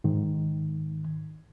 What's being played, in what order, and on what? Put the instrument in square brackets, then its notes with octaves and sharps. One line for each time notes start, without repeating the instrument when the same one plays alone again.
[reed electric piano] G#2 D#3